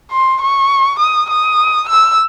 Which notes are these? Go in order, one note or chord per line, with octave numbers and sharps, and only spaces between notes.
C6
C#6
D#6
D#6
E6